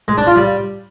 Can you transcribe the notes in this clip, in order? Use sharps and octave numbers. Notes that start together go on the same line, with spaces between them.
G#3
D4
F4
G3